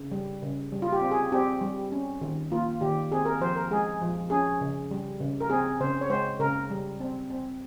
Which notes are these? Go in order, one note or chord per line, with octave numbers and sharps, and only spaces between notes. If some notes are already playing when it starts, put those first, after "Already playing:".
Already playing: C#3
G3
C#3
G3
F4
G4
C4
G#4
C4 G4
G3
C#4
D#3
A#3 F4
D#3 G4
C4 G#4
A#4
F3 C5
A#4
G#3 G#4
F3
C#4 G#4
C#3
G3
C#3
A#4
C4 G#4
C#3 C5
C#5
G#3 C5
C#3 A#4
G3
C4
C4